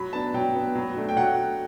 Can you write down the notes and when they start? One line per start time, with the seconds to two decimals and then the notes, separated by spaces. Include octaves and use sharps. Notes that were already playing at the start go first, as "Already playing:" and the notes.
Already playing: F#3 B5
0.13 B3 D4 A5
0.34 F#3 G5
0.55 B3 D4
0.75 F#3
0.96 A3 D4
1.09 G5
1.16 F#3 F#5